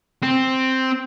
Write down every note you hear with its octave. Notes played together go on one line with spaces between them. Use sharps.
C4